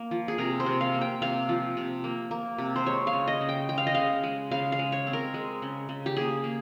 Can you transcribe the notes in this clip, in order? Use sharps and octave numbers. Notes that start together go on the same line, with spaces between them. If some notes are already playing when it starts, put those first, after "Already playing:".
Already playing: A#3
F3
G#4
C3 A#4
C5
C3
F5
A#3
G5
C3 F5
F3
C3
A#3
A#3
C3
C5
G#3 C#5
F5
C#3
D#5
C#3
G5
G#3 G5
F5
D#5
C#3 F5
G#3
C#3 F5
F5
G#3
C#5
C4
A#4
G#3
C#3
C#3
G4
A#3 G#4
A#3